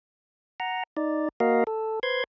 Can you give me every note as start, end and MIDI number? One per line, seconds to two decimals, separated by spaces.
0.60 0.83 78
0.60 0.83 82
0.97 1.29 63
0.97 1.29 74
1.40 1.64 58
1.40 1.64 66
1.40 1.64 70
1.40 1.64 75
1.40 1.64 77
1.67 1.99 69
2.03 2.24 71
2.03 2.24 72
2.03 2.24 84
2.03 2.24 92